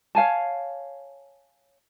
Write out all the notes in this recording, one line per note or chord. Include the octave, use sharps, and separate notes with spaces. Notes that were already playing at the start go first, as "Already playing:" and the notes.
C#5 F5 G#5 A5